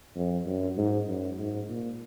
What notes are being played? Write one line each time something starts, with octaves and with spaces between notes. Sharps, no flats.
F2
F#2
G#2
F#2
G#2
A#2